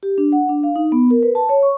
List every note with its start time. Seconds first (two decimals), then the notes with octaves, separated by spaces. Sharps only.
0.03 G4
0.18 D4
0.32 F#5
0.49 D4
0.63 F5
0.76 D#4
0.92 B3
1.11 A#4
1.23 B4
1.35 A5
1.49 C#5
1.63 C#6